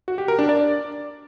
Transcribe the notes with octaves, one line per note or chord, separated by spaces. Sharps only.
F#4
G4
A#4
D4
D5